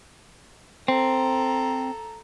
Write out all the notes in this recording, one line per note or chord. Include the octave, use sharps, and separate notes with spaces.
C4 A4 A#5